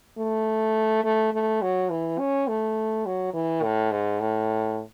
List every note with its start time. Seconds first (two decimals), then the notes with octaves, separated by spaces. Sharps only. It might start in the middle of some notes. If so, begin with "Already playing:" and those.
0.18 A3
1.04 A3
1.33 A3
1.62 F#3
1.90 E3
2.19 C#4
2.48 A3
3.06 F#3
3.34 E3
3.63 A2
3.92 G#2
4.21 A2